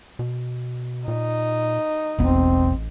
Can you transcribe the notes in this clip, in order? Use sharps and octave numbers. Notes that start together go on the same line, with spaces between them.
B2
A#2 D#4
E1 A1 B3 C4